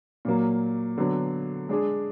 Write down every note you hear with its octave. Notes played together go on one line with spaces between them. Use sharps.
A#2 F#3 A#3
D3 F#3 B3
G#3 D4 G#4